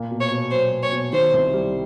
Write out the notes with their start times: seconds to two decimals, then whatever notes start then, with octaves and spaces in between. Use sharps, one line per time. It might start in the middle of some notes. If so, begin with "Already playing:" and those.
Already playing: A#2 A#3
0.11 B2
0.21 C#5
0.32 B2
0.51 F#3 C5
0.72 A#3
0.82 C#5
0.92 B2
1.12 D#3 C5
1.33 C2
1.53 G3